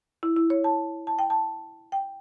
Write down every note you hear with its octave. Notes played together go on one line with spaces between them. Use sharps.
E4
E4
C#5
A5
A5
G5
A5
G5